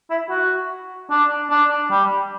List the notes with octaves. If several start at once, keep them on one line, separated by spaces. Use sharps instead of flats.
E4
F#4
D4
D4
G3